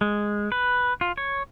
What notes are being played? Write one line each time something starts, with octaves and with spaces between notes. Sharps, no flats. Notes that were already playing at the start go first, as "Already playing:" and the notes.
G#3
B4
F4
C#5